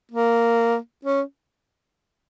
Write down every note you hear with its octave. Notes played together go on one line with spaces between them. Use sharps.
A#3
C#4